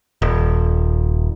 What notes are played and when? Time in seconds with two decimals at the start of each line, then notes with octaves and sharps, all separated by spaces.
0.22 D#1